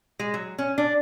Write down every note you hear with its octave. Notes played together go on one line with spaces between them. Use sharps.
G#3
F#3
C#4
D4